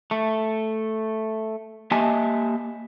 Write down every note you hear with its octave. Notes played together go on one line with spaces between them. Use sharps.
A3
A#3 G4 D#5 E5 G#5 A5